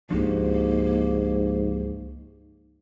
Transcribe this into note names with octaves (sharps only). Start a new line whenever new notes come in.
C#2 G#2 F3 A#3 D4 F#4 G4